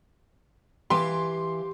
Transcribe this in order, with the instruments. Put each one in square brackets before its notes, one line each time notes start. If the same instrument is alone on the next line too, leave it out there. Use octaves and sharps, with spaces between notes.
[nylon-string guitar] E3 F5 G#5 [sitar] G4 [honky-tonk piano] C6